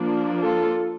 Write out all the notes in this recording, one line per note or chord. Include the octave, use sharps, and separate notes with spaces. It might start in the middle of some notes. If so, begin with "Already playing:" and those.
Already playing: F3 A#3 D4
F4 A4